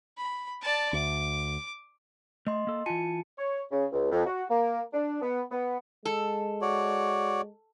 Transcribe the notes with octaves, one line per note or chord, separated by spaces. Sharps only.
B5
D5 A5
D2 D6
A3 D#5 C6
A#3 A4
E3 F4 G#5 A5 C#7
C#5
C#3
C#2
F2
F#4
A#3
D4
B3
B3
G#3 A4
F#4 C#5 D5